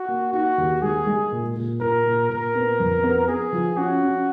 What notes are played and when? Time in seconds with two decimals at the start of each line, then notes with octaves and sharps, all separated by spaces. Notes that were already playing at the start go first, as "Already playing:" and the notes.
Already playing: F#4
0.08 A#3
0.33 D#4 F#4
0.58 D#2
0.82 G#3 G#4
1.07 G#3
1.32 A#2
1.56 A#2
1.80 A#2 A#4
2.06 A#2
2.29 A#2 A#4
2.55 B3
2.80 F2
3.04 B3
3.28 B3 G#4
3.53 F3
3.77 C#4 F#4
4.03 C#4